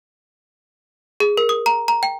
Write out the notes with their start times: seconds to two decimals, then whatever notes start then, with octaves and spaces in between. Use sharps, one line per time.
1.20 G#4
1.37 A#4
1.49 D#6
1.66 A#5
1.88 A#5
2.03 G5